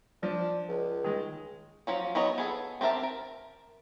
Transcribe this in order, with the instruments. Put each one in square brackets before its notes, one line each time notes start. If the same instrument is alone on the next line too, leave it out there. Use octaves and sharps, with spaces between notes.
[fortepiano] F3 [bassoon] D4
[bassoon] C#2
[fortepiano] D#3 G#3
[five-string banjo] F3 F#3 C#4
F#3 B3 C#5 D#5
B3 G#4 A4
C4 G4 A#4 E5 A5
A#4